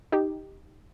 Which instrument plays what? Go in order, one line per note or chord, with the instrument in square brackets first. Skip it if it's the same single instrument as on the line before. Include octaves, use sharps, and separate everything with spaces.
[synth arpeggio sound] D#4 G4